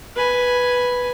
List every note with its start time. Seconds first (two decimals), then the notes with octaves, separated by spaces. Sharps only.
0.16 B4 G#5